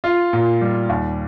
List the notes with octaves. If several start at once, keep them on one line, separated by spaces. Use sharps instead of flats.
F4
A#2
G3
D#2